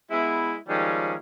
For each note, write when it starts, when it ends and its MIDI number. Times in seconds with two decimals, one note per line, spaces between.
0.11 0.56 56
0.11 0.56 59
0.11 0.56 64
0.69 1.15 51
0.69 1.15 53
0.69 1.15 55
0.69 1.15 56
0.69 1.15 61